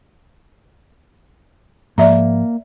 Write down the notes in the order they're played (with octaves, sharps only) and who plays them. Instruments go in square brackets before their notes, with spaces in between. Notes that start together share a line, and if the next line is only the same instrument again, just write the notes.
[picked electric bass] G#2 F3 [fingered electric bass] A#3 [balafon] D5 E5 A#5